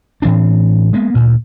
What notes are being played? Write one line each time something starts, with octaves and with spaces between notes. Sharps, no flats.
A2 E3 C4 D4
G#3 A#3 B3
D2 A#2